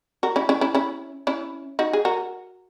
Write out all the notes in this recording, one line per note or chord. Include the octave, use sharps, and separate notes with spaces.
F#4 A#4
C#4 E4
C#4 E4
C#4 E4
C#4 E4
C#4 E4
D#4 F#4
G#4
F#4 A#4